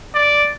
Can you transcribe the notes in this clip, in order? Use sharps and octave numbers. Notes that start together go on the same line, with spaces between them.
D5